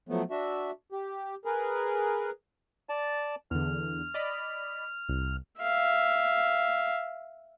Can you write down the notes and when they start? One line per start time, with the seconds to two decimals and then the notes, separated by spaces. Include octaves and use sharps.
0.09 F3 F#3 A3 B3
0.30 D4 F#4 E5
0.92 G4
1.45 G#4 A#4 B4
2.89 D5 A5
3.51 E2 D3 F6
4.14 D5 D#5 B5
5.09 C2
5.60 E5 F5